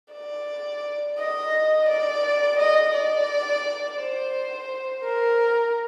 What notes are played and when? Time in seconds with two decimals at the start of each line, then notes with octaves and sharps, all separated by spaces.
0.13 D5
1.19 D#5
1.89 D5
2.59 D#5
2.93 D5
3.99 C5
5.04 A#4